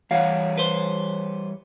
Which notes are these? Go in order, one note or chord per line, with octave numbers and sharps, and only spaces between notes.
E3 G3 C#5 F5 F#5
B4 C5